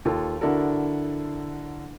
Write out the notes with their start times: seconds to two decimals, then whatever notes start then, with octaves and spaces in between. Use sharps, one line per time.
0.05 D#2 F4 A4
0.41 D3 D4 E4 F#4 A4 A#4